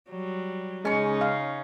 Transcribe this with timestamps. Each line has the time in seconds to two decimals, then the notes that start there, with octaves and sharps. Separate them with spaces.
0.10 F#3 G3
0.85 C#3 G#3 C#4 D#4 C#6
1.21 F5